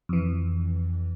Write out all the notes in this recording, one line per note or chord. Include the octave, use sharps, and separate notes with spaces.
F2 E3